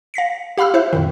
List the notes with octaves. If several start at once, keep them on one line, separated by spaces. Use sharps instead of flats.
F5 A#6 B6 C#7
G4 F5 B5 E6 F6
E4 C5 E5 F#6
F2 A#2 D#3